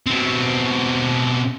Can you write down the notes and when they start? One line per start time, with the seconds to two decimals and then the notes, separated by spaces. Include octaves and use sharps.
0.07 B2 C4